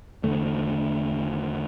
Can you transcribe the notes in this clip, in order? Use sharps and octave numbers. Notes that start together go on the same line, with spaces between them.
E2 D3 A3